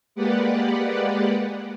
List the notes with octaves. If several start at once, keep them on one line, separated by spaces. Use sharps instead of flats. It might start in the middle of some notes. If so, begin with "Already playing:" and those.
G#3 A#3 G4 B4 D5 F#5